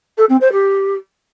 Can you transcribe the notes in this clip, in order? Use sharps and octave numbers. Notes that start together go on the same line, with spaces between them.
A4
C4
C5
G4